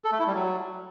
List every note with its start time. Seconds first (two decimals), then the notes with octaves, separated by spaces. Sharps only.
0.04 A4
0.12 A3
0.19 E4
0.27 G3
0.34 F#3